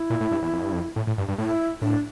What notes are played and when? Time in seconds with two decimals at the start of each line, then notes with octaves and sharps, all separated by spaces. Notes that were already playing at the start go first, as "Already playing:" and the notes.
Already playing: E4
0.10 A#2
0.21 A2
0.31 G2
0.42 E2
0.53 F2
0.63 G2
0.73 F2
0.96 A2
1.07 A2
1.18 G2
1.28 G2
1.38 A2 E4
1.82 A2 D4